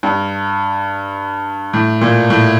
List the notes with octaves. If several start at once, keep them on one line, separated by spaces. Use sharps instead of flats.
G2
A2
A#2
A2